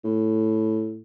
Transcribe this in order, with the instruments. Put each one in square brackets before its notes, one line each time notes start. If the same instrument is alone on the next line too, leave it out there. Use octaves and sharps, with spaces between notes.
[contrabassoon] A2